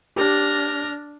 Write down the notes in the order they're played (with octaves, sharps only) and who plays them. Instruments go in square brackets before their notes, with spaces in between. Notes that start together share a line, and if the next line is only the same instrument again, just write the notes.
[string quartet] D4 F6 A#6 [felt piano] G4